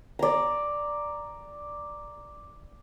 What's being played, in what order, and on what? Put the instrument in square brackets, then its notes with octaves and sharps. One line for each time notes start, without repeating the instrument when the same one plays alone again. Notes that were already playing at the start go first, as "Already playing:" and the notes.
[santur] D5 A#5